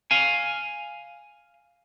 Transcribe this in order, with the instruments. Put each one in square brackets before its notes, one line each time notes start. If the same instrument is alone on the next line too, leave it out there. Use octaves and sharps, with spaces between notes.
[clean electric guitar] F5 G#5